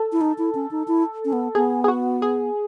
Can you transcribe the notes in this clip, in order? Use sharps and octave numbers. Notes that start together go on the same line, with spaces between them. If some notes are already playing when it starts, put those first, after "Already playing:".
Already playing: A4
E4
D#4
E4
C#4
D#4
E4
C#4
B3
B3 G#4
G#4
F#4
G#4